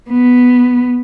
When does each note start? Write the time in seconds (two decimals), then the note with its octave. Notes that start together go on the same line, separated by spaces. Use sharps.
0.10 B3